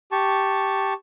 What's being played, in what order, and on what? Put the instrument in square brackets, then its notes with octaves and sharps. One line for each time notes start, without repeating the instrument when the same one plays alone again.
[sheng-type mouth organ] G4 A5 C#6